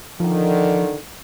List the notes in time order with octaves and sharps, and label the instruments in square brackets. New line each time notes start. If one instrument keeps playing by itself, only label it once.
[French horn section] D3 D#3 [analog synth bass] F3